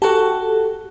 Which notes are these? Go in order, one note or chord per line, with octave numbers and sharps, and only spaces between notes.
F#4 G4 A4 A5